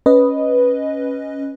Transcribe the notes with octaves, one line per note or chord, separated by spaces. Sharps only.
C#4 B4 D#5